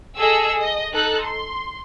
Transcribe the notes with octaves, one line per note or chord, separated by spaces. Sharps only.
G#4 A4 D#5 E6
D#5
D#4 A4 F#6
C6